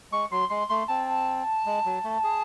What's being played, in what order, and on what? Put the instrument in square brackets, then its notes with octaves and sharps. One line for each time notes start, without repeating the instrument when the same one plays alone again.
[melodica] G#3 [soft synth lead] C#6
[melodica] F#3 [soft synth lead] C6
[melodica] G#3 [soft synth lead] C6
[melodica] A3 [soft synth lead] C6
[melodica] C4 [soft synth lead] A5
[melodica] G#3
F#3
A3
G#4